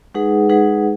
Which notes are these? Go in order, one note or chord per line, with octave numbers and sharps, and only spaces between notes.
G#3 D#4 G#4 B4 F#5
G#3 D#4 G#4 B4 F#5